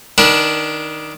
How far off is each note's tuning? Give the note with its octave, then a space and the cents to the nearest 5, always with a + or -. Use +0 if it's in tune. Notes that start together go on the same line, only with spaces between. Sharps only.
D#3 +0 D4 +0 B4 -35